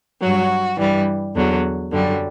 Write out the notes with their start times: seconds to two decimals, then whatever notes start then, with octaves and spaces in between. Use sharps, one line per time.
0.21 G2 F#3 F#4
0.78 G2 E3 G3
1.34 E2 D3 F#3
1.92 F#2 D3 G3